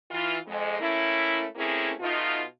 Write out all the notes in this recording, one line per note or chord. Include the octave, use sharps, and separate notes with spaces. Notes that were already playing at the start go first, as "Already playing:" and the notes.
E3 F4
F2 G#3
A3 A#3 C#4 E4
A3 A#3 C4 C#4 E4 G#4
B2 A3 D#4 F4